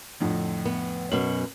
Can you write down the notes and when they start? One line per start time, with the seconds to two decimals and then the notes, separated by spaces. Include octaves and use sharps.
0.21 F2 A2 D3
0.65 B3
1.12 F#2 B2 F#7